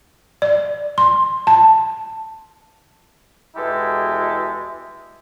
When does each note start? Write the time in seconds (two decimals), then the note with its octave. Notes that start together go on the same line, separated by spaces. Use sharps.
0.42 D5
0.98 C6
1.47 A5
3.56 E2 B2 G#3 E4 G4 A4